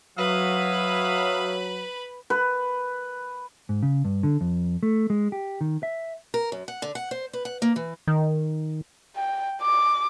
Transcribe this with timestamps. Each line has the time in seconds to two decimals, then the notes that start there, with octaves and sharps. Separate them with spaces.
0.18 F#3 B4 E5 F5 B5 D#6
2.30 B4
3.69 G#2
3.83 C#3
4.05 G2
4.23 D3
4.41 F2
4.83 A3
5.10 G#3
5.32 G4
5.61 D#3
5.83 E5
6.34 A#4
6.52 F#2
6.68 F#5
6.82 D3
6.95 F#5
7.11 C5
7.33 B4
7.45 F#5
7.62 A#3
7.76 E3
8.08 D#3
9.16 G5
9.61 D6